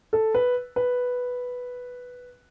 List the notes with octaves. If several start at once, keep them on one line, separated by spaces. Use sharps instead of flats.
A4
B4
B4